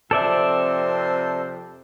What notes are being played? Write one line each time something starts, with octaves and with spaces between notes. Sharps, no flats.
F2 C3 A4 C5 D5 E5